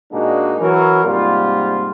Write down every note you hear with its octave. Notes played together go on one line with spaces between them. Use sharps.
A#2 G#3 A#3 D4 D#4 F#4
E3 F#3 A#4
G#2 C3 G3 A#3 F4